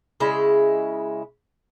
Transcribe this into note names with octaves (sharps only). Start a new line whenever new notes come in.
C#3 G#3 E4